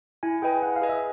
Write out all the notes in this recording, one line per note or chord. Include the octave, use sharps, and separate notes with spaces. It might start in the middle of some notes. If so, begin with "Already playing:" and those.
E4 G#5
G#4 B4 D#5 G5 G#5
E4 F#5
F5
G#4 B4 D#5 G#5
E5